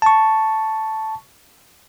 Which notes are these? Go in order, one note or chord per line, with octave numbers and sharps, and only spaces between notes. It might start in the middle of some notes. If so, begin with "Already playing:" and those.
A5 C#6